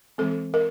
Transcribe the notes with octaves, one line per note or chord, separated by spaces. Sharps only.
E3 G#3 C4 A4
A#4